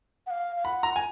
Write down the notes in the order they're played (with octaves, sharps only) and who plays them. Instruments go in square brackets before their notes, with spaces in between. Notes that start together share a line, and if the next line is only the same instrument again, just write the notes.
[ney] F#5
F5
F5
[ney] F#5 [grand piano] B5
[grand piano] A#5
G#5